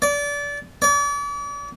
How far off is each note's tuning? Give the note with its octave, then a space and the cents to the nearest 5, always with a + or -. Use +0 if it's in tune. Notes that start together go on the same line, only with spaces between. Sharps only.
D5 -25
D5 -40